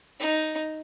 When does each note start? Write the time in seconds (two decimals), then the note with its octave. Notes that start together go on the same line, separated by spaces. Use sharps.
0.20 D#4